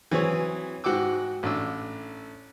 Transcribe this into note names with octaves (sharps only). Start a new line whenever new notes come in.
E3 F#3 C4 G#4 B4 C#5
G#2 F#4 F#5 G5 D6 E6
A1 D4 E6